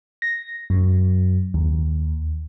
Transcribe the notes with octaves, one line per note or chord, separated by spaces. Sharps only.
A#6
F#2
D#2